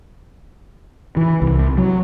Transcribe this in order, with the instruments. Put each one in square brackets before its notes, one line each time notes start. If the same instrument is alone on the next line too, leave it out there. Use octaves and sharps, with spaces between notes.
[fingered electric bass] E3
C2
F#3